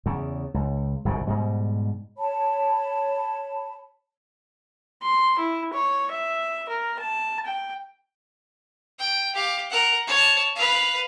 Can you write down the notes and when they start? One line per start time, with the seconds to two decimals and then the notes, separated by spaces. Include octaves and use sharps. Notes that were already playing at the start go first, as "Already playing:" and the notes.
0.06 E2 C#3
0.54 C#2
1.05 G1 C2 G#2 B2
1.27 G#2 B2 G3
2.18 C#5 A5 B5
5.02 C6
5.38 E4
5.73 C#5
6.12 E5
6.69 A#4
7.00 A5
7.46 G5
8.99 G5
9.34 G4 F5
9.70 A#4 F#5
10.07 C#5 A5
10.56 B4 F5